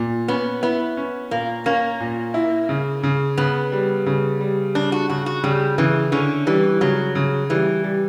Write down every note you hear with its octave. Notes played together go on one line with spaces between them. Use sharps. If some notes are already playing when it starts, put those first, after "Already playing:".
Already playing: A#2
B3 C#4
B3 E4
C#4
A#2 A#3
A#3 C#4
A#2
E4
C#3
C#3
C#3 B3
G3
C#3
G3
C#3 D4
F#4
C#3 F#4
F#4
C#3 G3
C#3 E3
D3 C#4
E3 G3
C#3 F#3
C#3
E3 G3
G3